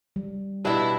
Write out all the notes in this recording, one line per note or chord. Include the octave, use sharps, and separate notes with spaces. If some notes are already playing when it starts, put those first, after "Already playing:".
G3
B2 D4 E4 G4